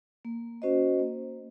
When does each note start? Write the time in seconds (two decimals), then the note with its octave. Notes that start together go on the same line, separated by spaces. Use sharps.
0.25 A#3
0.62 C#4 F#4 C5 D#5
0.99 A#3